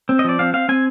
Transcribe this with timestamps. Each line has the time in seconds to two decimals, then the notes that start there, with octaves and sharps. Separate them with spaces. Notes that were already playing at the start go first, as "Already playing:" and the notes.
0.09 C4
0.19 D#5
0.24 F3 D5
0.39 C4 F5
0.53 C4 F5
0.69 C4 G#5